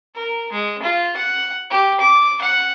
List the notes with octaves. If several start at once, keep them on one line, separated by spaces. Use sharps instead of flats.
A#4
G#3
F4
F#5
G4
D6
F#5